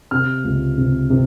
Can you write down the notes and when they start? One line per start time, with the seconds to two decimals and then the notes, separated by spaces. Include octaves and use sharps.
0.11 C3 F6
0.44 C#2
0.78 C3
1.10 C3